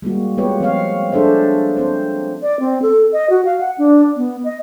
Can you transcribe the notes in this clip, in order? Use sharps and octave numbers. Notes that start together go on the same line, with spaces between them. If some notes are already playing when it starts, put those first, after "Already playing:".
G3 G#3 A#3 F#4
G#3 B3 F4 G4 B4 C#5
F3 C4 C#5 F5
D4 G#4 A4 C5 E5
C4 C5
D5
C4
A4
D#5
F#4
F5
F#5
D4
B3
D#5